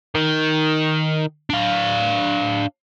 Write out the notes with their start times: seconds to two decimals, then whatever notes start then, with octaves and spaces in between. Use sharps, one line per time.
0.15 D#3
1.50 D4 F5